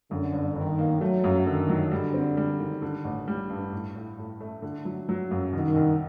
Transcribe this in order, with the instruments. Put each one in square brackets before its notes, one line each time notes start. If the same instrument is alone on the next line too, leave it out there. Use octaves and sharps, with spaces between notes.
[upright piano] F#2 [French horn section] D3
[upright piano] G1
[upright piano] G1 [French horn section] D#3
[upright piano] A#3
[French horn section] F#3 [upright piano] A3
[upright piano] F#2
[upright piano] D3 [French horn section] D#3
[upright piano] F#3
[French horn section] D3 [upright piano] G3
[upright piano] C4
G3
D#3
D3
A1
G3
G2
A2
A2
A2
A3
D3
F#3
F#3
F#2
[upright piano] C2 [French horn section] D#3
[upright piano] C2